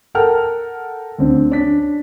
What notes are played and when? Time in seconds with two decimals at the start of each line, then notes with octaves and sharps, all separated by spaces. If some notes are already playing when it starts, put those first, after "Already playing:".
0.15 A4 A#4 F#5 G5 A5 F6
1.19 D2 C4 D4
1.50 C#4 D4 B6